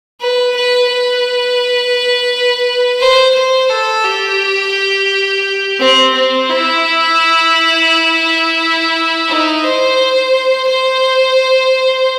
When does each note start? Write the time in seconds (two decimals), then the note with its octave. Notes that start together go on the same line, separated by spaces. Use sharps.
0.20 B4
0.56 B4
0.89 B4
3.00 C5
3.34 C5
3.69 A4
4.05 G4
5.80 C4
6.14 C4
6.49 E4
9.29 D#4
9.63 C5
10.68 C5